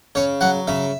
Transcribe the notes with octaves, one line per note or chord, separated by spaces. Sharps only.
C#3 C#5
F#3 F#5
C#3 E5